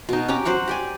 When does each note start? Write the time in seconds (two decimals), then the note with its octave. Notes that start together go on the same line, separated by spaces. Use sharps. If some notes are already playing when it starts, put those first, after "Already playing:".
0.09 B2 D#4
0.28 C#4 G4 A#5 D6
0.45 F#3 C5 F#5 C#6
0.68 G4 D5 G#5